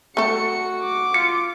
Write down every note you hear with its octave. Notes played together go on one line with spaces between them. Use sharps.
A3 F#4 A4 C#7
D6
F4 C#7